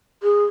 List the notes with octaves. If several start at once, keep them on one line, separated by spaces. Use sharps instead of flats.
G#4